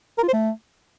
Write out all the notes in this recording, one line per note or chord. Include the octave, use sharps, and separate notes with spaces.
A#4
F4
C5
A3